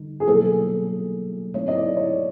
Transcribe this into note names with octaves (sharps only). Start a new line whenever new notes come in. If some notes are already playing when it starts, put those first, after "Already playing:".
Already playing: D3 G3 D#4
G#4
B2 F#3 A#3 A4
A3 C4 D#4 C#5
D#5
D5
C#5